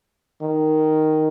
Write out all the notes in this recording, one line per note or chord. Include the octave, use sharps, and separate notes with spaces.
D#3